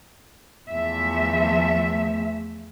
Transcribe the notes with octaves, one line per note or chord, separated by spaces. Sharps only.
E2 F3 A3 E5